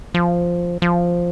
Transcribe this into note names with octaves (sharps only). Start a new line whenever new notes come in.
F3
F3